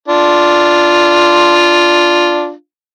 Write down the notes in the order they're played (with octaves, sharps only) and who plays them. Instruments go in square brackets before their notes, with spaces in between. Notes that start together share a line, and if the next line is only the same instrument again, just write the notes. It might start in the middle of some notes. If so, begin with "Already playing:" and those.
[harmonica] D4 F4